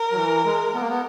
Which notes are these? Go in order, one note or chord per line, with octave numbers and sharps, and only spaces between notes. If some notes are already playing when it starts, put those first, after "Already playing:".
Already playing: A#4
F#3
E3
G#3
B3
A#3
B3